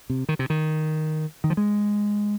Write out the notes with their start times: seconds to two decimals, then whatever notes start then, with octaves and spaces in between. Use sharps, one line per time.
0.10 C3
0.29 D#3
0.39 C3
0.50 D#3
1.44 D#3
1.50 F3
1.57 G#3